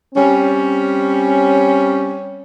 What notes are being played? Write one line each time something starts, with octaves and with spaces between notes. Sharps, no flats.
G3 C4 C#4